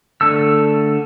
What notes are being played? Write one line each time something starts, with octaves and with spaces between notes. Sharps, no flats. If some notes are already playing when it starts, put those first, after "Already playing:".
D3 A3 A4 E6